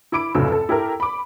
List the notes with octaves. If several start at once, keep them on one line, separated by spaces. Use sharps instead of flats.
E4 B5 D6 D7
F1 C#2 A2 F#3 E6
A4
E4 G4 A4 A#4
B5 D6